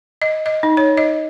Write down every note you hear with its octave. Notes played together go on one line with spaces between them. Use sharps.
D#5
D#5
D#4
C#5
D#5